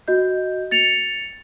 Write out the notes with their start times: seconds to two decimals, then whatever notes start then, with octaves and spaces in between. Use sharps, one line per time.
0.08 F#4 D#5 G6
0.71 A6 C#7 F7